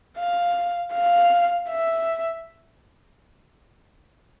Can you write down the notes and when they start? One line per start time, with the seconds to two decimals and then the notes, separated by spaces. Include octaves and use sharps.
0.18 F5
0.93 F5
1.70 E5